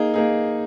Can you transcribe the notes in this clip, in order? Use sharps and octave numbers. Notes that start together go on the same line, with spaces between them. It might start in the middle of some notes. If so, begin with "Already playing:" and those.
Already playing: A#3 D#4 G#4
A#3 D#4 G#4